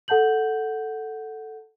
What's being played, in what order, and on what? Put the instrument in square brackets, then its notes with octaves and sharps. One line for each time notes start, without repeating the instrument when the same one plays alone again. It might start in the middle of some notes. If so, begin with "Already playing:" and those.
[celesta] A4 F#5 A5 G6 F#7